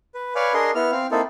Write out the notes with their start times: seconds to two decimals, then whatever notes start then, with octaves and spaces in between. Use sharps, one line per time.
0.14 B4
0.35 B4 C#5 D5 F5 G#5
0.54 D4 G#4 A#4 D#5 C6
0.75 B3 E4 F6
0.92 C4 F5
1.11 A#3 C4 D#4 E4 A4